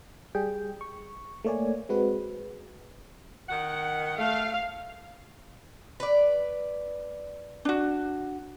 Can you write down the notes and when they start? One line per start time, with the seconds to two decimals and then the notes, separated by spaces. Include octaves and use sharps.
0.35 G3 G#4 G5
0.81 C#6
1.44 A3 A#3 C#5 D5 G#5
1.89 G#3 C4 F#4 B4
3.49 D#3 F#5
4.18 A3 F5
6.00 B4 D5
7.65 D4 F#4